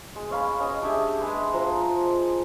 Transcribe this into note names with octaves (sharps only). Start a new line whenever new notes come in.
G#3
C#4 F5 B5
C#4 D#5 G#5
D4 G4 G#4 E5
G#3 B4 C6
F3 C5 A#5